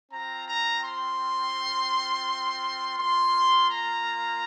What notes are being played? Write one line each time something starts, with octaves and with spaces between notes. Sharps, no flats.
C4 F4 A#5
A#5
C6
A#3 F4 C6
A#5